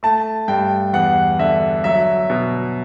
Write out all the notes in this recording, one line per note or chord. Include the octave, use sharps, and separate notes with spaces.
A3 A5
G2 G5
E2 F#5
D3 E5
F#3 E5
B2